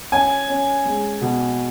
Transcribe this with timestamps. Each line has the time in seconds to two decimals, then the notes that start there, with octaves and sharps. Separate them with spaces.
0.12 C#4 G#5
0.49 C#4
0.85 G#3
1.22 B2